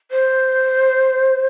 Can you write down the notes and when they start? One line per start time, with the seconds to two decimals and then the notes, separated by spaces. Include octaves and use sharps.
0.11 C5